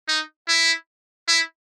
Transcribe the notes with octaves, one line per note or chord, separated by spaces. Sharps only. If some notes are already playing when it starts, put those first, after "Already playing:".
D#4
E4
E4